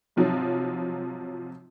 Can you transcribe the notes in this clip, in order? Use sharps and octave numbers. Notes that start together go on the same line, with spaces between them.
G#2 C3 F3 F#3